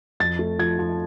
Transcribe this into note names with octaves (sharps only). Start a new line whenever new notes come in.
F2 A6
A3
F3 G#6
F3